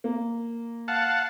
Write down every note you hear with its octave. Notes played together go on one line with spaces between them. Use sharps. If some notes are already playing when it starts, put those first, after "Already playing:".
A#3
F5 F#5 A5